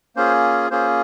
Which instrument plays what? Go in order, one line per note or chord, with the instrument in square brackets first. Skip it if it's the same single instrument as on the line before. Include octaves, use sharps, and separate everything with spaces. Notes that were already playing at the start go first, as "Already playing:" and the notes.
[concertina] A#3 C#4 F4 G#4 C5
A#3 C#4 F4 G#4 C5